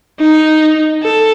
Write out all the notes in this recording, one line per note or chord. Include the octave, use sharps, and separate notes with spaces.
D#4
A4